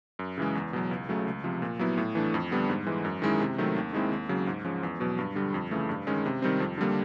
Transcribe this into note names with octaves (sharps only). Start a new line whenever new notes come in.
F#2
C#3 E3 G#3
E2
B2 F#3
C#2
C#3 F#3 A3
C#2
C3 F3
A#2
F#3 B3 E4
A2
E3 A3 D4
F2
D3 G3 B3 D4
G#2
E3 G#3
F#2
D#3 G#3 C#4 E4
C3
D#3 F#3 A3 C4
D#2
D#3 G#3 C4 E4
D#2
C#3 F#3
G#2
F3 G#3 C#4
E2
B2 F#3
G2
D3 G3
F2
C#3 E3 A3
G2
D#3 G#3 C#4
C3
D#3 G3 C4
F2
D3 G3 A#3